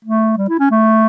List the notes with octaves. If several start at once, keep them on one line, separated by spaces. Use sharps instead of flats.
A3
G3
E4
C#4
A3